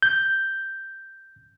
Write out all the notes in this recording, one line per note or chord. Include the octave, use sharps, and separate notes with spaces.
G6